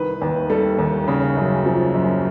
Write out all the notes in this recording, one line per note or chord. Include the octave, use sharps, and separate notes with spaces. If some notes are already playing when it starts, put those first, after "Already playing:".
Already playing: C2 D#3 B4
D#2
G3 A4
D#2
C#3
F#2
F3
F#2